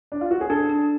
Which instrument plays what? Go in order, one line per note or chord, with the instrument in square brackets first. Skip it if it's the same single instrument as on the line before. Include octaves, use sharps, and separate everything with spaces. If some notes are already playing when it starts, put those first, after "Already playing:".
[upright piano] D4
F4
F#4
G#4
[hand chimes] D4 [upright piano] A4
[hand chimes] D4